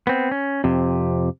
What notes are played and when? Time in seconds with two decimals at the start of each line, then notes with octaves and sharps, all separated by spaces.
0.07 B3 C4
0.31 C#4
0.64 F2 C3